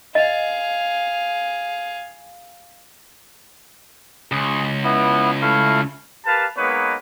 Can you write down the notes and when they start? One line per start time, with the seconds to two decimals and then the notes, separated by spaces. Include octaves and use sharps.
0.15 G#4 D#5 F5
4.32 C#2 G#4
4.84 B3 E4
5.42 A3 E4 F5
6.26 G4 A#4 B4 F5 A5
6.58 G#3 A#3 B3 D#4 B4 C#5